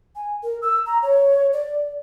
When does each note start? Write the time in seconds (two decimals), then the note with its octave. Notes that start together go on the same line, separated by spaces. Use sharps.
0.16 G#5
0.43 A#4
0.62 E6
0.86 A#5
1.03 C#5
1.53 D5